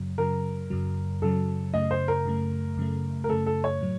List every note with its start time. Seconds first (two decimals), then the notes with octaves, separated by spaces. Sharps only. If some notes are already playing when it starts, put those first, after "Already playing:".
Already playing: F#2 C#3 F#3
0.18 F#2 C#3 F#3 A#4
0.70 F#2 C#3 F#3
1.22 F#2 C#3 F#3 A4
1.74 F#2 C#3 A3 D#5
1.91 C5
2.08 A#4
2.26 F#2 C#3 A3
2.77 F#2 C#3 A3
3.24 A#4
3.29 F#2 C#3 A3 A4
3.46 A4
3.64 C#5
3.81 A2 F#3